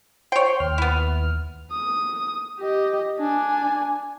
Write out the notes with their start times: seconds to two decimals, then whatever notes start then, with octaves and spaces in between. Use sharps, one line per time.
0.32 C5 C#5 G5 C6
0.60 D#2 F6
0.78 B3 E4
1.72 D#6
2.60 G4 D#5
3.19 D4 G#5